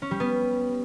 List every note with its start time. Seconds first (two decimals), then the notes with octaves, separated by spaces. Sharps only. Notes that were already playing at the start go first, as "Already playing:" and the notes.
0.02 C#4
0.11 G3
0.20 B3